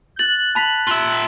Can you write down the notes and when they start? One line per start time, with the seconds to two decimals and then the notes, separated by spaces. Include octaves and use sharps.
0.19 F#6 A6 F#7
0.55 A5 B5 B6
0.87 F4 E5